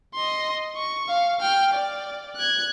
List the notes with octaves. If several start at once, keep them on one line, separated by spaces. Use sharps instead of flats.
D#5 C6
C#6
F5
G5 F6
D5
F#6 G#6